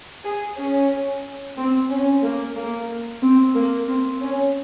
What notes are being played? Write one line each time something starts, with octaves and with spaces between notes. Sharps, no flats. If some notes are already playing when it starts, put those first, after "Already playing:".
G#4
C#4
C4
C#4
A#3
A#3
C4
A#3
C4
C#4